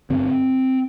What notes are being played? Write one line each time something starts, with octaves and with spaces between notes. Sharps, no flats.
G2 D3 C4